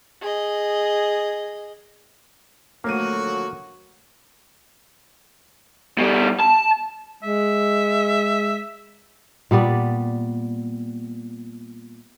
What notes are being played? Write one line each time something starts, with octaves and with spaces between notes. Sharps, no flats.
G#4 D#5
D3 F3 F#3 A3 A#3 F#4 D#7
B2 G3
A5
G#3 E5
A#2 G3 B3 D5